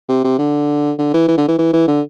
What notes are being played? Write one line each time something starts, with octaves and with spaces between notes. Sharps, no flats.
C3
C3
D3
D3
E3
E3
D3
E3
E3
E3
D3